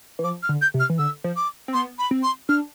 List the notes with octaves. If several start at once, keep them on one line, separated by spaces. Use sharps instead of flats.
E3
F3 D6
F6
D3
G6
C3
F6
E3
D3 E6
F3
D6
C4
B3 C6
B5
C4
C6
D4 F6